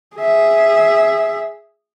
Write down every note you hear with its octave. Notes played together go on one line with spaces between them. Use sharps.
G#4 E5